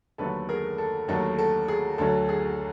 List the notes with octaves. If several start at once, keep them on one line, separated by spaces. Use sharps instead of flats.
D#2 D3 F#3 A3 A4 B4
G#4 A#4
A4
D#2 D3 F#3 A3 A4
A4
G#4
D2 D3 F#3 A4
G#4